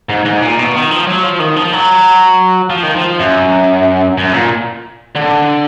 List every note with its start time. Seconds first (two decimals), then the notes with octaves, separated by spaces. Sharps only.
0.10 G#2
0.26 G#2
0.42 A#2
0.59 B2
0.75 D#3
0.91 F3
1.07 F#3
1.24 F3
1.40 D#3
1.56 F3
1.73 F#3
2.70 F3
2.83 D#3
2.96 F3
3.19 F#2
4.18 F#2
4.33 A#2
5.16 D3